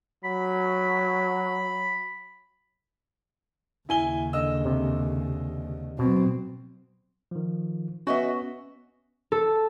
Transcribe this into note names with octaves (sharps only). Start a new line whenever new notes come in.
F#3 B5
D#2 C#3 E4 G#5 G7
D3 D#5 E6
C3
B2 F#3 C4
D#3 F3
B3 C#4 F#4 D#5 E5
A4